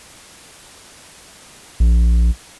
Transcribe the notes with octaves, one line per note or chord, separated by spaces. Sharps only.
A#1